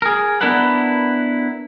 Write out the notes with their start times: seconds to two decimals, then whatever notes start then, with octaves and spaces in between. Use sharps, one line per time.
0.02 G#4 A#4
0.41 B3 D4 E4 A#4 B4 F#5